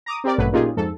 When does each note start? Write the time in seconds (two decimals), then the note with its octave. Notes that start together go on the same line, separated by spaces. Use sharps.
0.06 A#5 D6 D#6
0.24 C4 G4 A#4 D5
0.38 A1 G2 B2 F#3 A3 B4
0.52 A#2 C#4 D#4 F4 G4 G#4
0.77 F2 G#2 A4